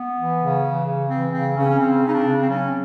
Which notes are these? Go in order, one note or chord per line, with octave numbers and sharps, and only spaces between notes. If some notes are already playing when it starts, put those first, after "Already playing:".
Already playing: B3
E3
C#3
E3
C#3
E3 C4
C#3 C4
C#3 C#4
C#4
C#3 C4
C#3
D#4
D4
C#3
C4
F#3 C#4